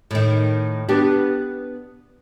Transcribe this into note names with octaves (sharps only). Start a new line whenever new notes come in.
A2 D#3
B3 D4 G4